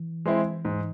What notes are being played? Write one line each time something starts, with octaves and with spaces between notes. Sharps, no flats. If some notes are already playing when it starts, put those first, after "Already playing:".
Already playing: E3
G#3 C4 E4
G#2